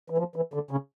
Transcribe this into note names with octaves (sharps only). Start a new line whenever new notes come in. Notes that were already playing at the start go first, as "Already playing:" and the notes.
E3
F3
E3
D3
C#3